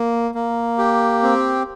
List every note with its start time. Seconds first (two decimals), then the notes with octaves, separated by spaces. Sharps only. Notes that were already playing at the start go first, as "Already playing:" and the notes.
Already playing: A#3
0.35 A#3
0.78 G4
1.23 C4